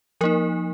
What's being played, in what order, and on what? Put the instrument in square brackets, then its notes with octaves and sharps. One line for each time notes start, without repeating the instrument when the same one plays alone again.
[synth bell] F3 A#3 D#4 A#4